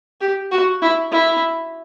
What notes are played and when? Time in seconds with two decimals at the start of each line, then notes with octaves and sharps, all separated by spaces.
0.21 G4
0.51 F#4
0.82 E4
1.12 E4